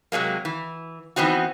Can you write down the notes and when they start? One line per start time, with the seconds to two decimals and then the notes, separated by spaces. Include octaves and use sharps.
0.12 C3 F#3 G#3 A#3
0.45 E3
1.16 E3 B3 C4 D#4 F#4